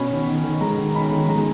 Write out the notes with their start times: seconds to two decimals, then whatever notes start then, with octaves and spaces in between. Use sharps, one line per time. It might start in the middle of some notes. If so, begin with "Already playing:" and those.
Already playing: B2 C#4 B5
0.11 D#3
0.27 D#3
0.44 D#3
0.61 G#3 A#5
0.78 D#3
0.95 D#3 B5
1.11 D#3
1.29 G#3 A#5